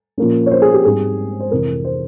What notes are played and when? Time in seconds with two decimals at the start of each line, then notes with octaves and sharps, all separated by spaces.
0.18 A#2 F3 A#3 C#4
0.46 C#5
0.51 C5
0.62 G#4
0.74 G4
0.85 G#2 G3 C4 G#4
1.40 C5
1.51 F2 C3 E3 A#4
1.85 C5